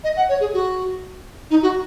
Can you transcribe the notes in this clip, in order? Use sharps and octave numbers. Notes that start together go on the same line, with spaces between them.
D#5
F#5
C#5
G#4
F#4
D#4
F#4